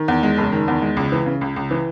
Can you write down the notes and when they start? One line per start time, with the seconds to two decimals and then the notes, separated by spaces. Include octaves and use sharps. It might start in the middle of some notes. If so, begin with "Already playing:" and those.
Already playing: D#3
0.08 E2
0.23 G#3
0.38 F#1
0.52 D#3
0.68 E2
0.82 G#3
0.97 C#2
1.12 E3
1.26 C#3
1.41 C#2
1.56 C#2
1.71 E3